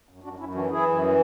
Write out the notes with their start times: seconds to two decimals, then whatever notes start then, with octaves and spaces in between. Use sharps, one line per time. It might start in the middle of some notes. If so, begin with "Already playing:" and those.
0.09 F#2
0.24 F#2 D4 F#4
0.39 F#2 C#4 E4
0.54 E3 D4 F#4
0.70 E3 E4 G#4
0.86 F#2
1.02 E3